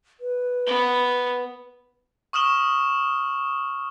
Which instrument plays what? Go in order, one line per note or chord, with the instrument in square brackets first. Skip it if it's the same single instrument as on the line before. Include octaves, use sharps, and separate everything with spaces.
[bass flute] B4
[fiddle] B3
[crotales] C#6 D#6 F6 E7 G7